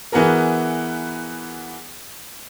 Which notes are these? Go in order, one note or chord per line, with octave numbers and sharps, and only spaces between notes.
E3 B3 F#4 G#4 A#4